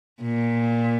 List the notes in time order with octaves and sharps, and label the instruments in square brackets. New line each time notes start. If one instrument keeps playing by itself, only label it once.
[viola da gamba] A#2